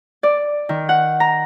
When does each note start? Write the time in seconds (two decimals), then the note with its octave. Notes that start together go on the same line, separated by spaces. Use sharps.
0.23 D5
0.69 D#3
0.89 F#5
1.20 A#5